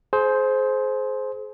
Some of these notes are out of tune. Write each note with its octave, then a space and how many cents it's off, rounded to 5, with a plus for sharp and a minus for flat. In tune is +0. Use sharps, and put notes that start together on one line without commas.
G#4 +35 C5 +0